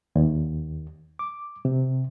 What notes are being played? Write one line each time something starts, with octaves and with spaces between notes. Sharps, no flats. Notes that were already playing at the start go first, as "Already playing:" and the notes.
D#2
D6
C3